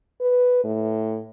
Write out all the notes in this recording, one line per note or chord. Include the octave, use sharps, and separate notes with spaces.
B4
A2